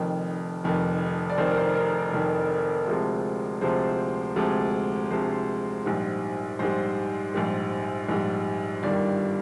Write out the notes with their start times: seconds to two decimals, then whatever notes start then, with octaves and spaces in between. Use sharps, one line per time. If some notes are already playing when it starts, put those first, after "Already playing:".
Already playing: F1 F2 D#3 G5
0.64 F1 F2 D#3
1.30 D5
1.38 F1 F2 D#3 C5
1.52 A#4
1.57 C5
1.75 A#4
2.13 F1 F2 D#3
2.87 D2 C3 F3 G#3
3.61 D2 C3 F3 G#3 C5
4.36 D2 C3 F3 G#3
5.11 D2 C3 F3 G#3 C5
5.85 A#1 G#2 G3
6.59 A#1 G#2 G3 C5
7.34 A#1 G#2 G3
8.09 A#1 G#2 G3
8.83 G1 G2 D#3 G3 D5